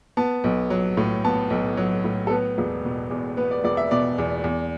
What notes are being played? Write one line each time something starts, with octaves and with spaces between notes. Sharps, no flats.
B3 A5
B1
F#3
A2
B3 A5
B1
F#3
A2
A4
B3 B4
E1
B2
E2
B3 B4
D5
E1 D5
E5
B2 D5
E2
E2